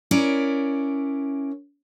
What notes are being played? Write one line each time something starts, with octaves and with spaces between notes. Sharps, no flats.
C#4 E4 A#4 D5